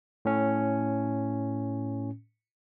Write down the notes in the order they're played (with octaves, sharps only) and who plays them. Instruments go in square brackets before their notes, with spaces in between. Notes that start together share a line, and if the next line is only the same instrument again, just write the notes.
[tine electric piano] A2 C#4